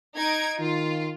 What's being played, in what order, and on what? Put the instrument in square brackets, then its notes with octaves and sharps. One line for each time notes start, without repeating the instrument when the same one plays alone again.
[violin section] D#4 G#6 D7
[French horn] D#3 [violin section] F4